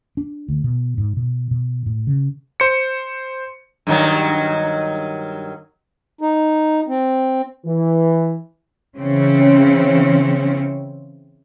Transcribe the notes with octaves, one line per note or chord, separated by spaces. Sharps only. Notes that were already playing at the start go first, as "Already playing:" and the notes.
D4
D2
B2
G#2
B2
B2
A2
C#3
C5 C#7
G2 D#3 F#3
D#4
C4
E3
C#3 E3 C4 C#4